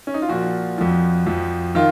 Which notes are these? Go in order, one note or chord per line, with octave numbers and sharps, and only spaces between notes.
C#4
D#4
F4
A#2 F3 F#4
F2 F3
F2 F3
D#3 F4